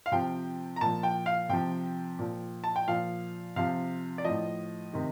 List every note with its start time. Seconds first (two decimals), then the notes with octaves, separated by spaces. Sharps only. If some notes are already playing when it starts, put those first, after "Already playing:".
0.06 F5
0.12 C3 F3 G5
0.76 A#5
0.81 A#2 F3 A5
1.03 G5
1.26 F5
1.49 C3 F3 G5
2.19 A#2 F3
2.64 A5
2.76 G5
2.88 A#2 F3 F5
3.56 C3 F3 F5
4.18 D5
4.25 A2 F3 D#5
4.93 C3 D#3